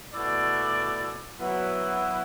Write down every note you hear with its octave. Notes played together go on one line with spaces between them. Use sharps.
B2 A3 E4 D5
F#3 B3 E4